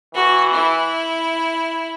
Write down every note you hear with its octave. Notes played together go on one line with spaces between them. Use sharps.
E3 F#4
E4